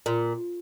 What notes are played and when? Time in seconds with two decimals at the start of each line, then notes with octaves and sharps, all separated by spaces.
0.06 A#2